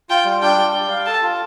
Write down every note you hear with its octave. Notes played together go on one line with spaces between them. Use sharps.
F4 G5
G3
D4 G5
G3
D5
F5
A4 A5
F4